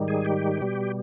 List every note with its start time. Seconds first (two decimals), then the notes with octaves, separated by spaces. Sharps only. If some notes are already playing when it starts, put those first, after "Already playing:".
Already playing: G#2 D#3 G3
0.08 G#4
0.25 G4
0.61 B2 G3